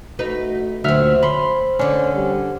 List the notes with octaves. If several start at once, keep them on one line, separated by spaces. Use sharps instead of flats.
A3 D#4 F#4 B4
D2 A#2 F#3 C4 E5 F6
C#4 C5 B5 C6
D3 C#4 D4
G3